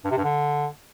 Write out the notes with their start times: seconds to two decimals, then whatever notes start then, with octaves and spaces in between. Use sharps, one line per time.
0.04 G2
0.11 C3
0.17 G2
0.24 D3